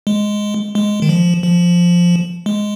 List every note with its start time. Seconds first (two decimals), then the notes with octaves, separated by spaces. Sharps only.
0.07 G#3
0.75 G#3
1.02 D#3
1.09 F3
1.43 F3
2.46 G#3